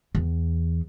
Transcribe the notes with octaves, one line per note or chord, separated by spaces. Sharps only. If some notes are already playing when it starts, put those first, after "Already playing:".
E2